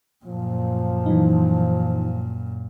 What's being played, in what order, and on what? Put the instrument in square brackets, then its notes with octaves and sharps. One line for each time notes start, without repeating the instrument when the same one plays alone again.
[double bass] F#2 A#2 [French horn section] F3
[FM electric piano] E3 F#3 D#4